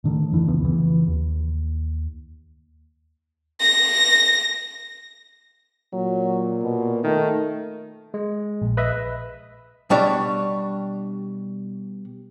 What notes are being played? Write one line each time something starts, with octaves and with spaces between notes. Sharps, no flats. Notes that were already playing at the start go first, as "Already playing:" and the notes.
A2 D3 D#3 A3
F2 D3 E3 A3
C#2 C#3 E3 B3
F2 C#3 E3
D#2
A#6
A#2 F#3
B2
D#3 A3
G#3
A#1
B4 D#5 E5
B2 G3 D4 C#5